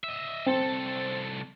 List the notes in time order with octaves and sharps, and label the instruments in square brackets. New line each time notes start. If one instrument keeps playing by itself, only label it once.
[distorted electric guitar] D#5 E5
[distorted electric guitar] C2 A4 [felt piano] C4